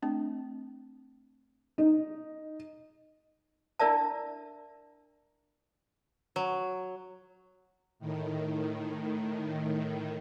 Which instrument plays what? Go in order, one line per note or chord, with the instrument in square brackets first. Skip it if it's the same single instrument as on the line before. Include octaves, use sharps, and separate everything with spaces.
[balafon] A3 C4 D4
[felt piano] D#4
[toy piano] D4 E4 A#4 D5 E5 A5
[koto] F#3
[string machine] A2 D#3